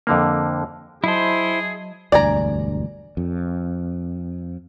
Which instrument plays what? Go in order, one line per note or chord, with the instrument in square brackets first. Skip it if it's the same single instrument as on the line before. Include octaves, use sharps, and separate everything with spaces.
[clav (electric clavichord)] F2 D3 A#3
[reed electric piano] F#3 D#5 A5 [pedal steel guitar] E4 C5 [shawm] G#4
[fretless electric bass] E1 D2 G2 [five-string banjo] D5 G#5 A#5
[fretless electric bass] F2